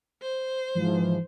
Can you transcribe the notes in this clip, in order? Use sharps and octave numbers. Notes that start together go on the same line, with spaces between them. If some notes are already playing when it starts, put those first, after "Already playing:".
C5
G#2 E3 F3